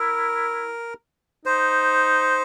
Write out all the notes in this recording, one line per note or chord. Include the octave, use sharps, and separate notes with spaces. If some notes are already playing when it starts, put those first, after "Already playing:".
Already playing: E4 A#4
D#4 C5